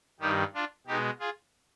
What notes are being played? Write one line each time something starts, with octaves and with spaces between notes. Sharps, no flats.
G2 D#3 G3 D#4 G4
D4 F4
B2 G#3 B3 D#4 G4
F4 G#4